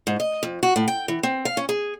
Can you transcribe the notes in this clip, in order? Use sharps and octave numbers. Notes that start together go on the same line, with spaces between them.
G#2
D#5
F2
F#4
A2
G5
E3
C4
F5
C#4
G#4